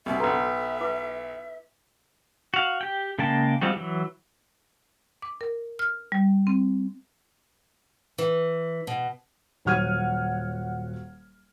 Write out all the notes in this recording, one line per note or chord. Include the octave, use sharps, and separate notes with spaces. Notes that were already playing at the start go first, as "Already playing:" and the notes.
C2 B2 E5
B1 A4 B4 A#5 C6
E4 B4 D6
F#4 F5
G4 G5
C#3 G#3 A#3 G5 A5
F3 G3 G#3 C4 F#4
E3 F#3
D6
A#4
F6
G3
C4
E3
B2
D#1 F#3 F#5 F6 G#6 D#7